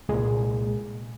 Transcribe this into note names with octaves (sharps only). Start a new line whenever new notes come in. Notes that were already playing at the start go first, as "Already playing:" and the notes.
C2 A#2 G#3 G#4